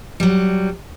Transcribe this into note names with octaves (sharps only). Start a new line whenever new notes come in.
F#3 G3